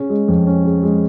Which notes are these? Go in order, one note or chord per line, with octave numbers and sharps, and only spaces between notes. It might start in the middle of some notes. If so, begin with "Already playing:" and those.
Already playing: C#3 C#4
G#3
F2
C#4
C#3
G#3